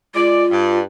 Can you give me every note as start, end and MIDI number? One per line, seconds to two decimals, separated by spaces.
0.15 0.44 56
0.15 0.79 65
0.15 0.44 74
0.51 0.81 43